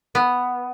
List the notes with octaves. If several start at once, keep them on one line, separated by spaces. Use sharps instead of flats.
B3